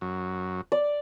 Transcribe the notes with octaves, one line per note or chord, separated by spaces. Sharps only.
F#2
D5